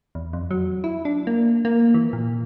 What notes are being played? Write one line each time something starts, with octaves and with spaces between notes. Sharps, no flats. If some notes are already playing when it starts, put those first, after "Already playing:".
E2
F2
F#3
E4
D4
A#3
A#3
E3
A#2